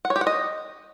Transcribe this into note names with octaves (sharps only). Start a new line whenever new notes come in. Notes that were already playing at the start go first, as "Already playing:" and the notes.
F#5
C#5
G4
F#5
D#5